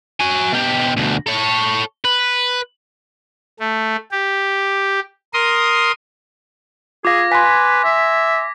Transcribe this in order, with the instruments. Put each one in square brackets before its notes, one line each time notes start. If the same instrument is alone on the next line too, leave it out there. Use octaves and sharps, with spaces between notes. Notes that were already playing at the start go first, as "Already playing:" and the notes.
[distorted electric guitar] F#4 G#5
B2 G4
D2 B2
A4 C#5
B4
[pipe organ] A3
G4
A#4 C6 D#6
[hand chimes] F4 F5 [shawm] G#4 [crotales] D6 G#6 A#6
[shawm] B4 [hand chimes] G#5 C6 [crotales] A#6 B6
[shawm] E5